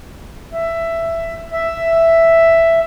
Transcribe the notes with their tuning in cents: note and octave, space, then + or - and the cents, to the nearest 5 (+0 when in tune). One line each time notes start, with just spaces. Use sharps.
E5 +10
E5 +5